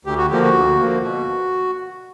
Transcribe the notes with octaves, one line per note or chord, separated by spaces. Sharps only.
D2 G4
F#4
D3 F3 A#3 G4
F#4
D2
D3 F3 A#3
B2 F#4